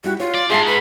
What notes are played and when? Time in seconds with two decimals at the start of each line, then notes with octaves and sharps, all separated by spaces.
0.04 G3 E4 F#4 G4
0.20 F4 C#5
0.35 D5
0.50 G#2 G#4 E5 F5 A5 C6
0.67 B4 B5